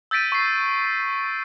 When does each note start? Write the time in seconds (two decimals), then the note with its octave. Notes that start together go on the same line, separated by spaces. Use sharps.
0.11 E6 G6 A6 B6 D7 D#7
0.32 C#6 C7